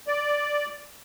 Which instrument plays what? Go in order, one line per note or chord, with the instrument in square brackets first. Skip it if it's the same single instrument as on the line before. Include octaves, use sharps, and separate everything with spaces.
[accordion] D5